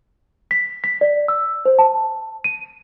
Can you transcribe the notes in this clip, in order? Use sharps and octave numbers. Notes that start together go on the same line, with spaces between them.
B6
B6
D5
E6
C5
A5
D#7